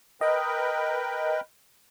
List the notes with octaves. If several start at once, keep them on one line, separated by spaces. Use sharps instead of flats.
A#4 B4 D#5 G5